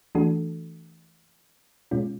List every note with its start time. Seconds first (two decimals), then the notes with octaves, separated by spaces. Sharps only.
0.15 E3 A3 D4 F#4 A4
1.91 B2 G#3 C#4 F4